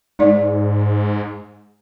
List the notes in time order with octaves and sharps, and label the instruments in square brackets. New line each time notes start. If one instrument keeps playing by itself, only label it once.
[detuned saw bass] G#2 [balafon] G#3 D#4 D5